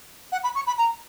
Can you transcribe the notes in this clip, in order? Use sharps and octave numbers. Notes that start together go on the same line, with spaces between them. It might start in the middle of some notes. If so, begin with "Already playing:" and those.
F#5
B5
C#6
B5
A#5